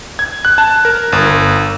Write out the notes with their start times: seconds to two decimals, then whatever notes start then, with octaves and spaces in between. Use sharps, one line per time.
0.19 G#6
0.45 F#6
0.58 A5
0.85 A#4
1.12 G1